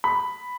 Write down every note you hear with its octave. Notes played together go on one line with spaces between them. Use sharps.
B5